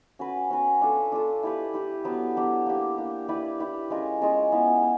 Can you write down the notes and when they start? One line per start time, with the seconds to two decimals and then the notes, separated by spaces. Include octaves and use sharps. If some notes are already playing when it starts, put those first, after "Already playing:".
0.19 C#4 F#4 B4
0.50 C#4 F#4 B4
0.81 D4 F4 A4
1.12 D4 F4 A4
1.43 E4 G4 B4
1.74 E4 G4 B4
2.04 F#3 B3 D4 G4
2.36 F#3 B3 D4 G4
2.66 A#3 D4 G4
2.97 A#3 D4 G4
3.28 E4 G4 B4 D5
3.60 E4 G4 B4 D5
3.90 G#3 C#4 F4 A#4
4.21 G#3 C#4 F4 A#4
4.52 B3 E4 G#4
4.83 B3